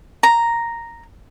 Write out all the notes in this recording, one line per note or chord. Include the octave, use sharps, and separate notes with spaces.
A#5